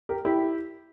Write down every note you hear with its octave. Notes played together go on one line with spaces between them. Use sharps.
G4 A#4
E4 G4